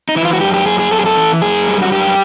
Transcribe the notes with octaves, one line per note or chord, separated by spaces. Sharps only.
D#4
E3 E4
F4
F#4
F#2 G4
G4
F#2 G#4
G#4
F#2 A4
G#4
A4
E3
F#2 G#4
G3
F#4
F#2 G4